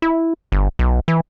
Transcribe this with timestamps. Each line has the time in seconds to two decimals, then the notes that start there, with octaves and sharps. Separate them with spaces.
0.02 E4
0.52 G1
0.79 B1
1.08 E3